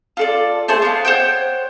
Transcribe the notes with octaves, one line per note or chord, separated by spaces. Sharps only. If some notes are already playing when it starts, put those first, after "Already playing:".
F4 A4 D5
A3 G#4 C5 A5
B3 F4
C5 C#5 F#5 G5